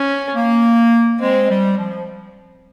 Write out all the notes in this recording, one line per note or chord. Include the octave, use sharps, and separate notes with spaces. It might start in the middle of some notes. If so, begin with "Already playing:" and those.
Already playing: C#4
A#3
G#3 C4
G3
F3